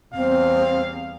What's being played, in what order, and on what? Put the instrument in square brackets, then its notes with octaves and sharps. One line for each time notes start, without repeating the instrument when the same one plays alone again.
[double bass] E2 G3 [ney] C4 [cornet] F5